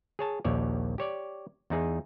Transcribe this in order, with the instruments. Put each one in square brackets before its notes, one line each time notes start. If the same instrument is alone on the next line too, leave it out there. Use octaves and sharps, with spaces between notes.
[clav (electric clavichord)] G#4 C#5 A5
A#1 D#2 C#5 D5
G4 C#5 D5
E2 D#4 G#4